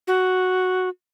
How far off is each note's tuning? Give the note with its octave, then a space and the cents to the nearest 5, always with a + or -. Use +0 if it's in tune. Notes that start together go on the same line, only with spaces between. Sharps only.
F#4 +0